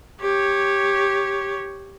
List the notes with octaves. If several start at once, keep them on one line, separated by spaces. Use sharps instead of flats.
G4 C#5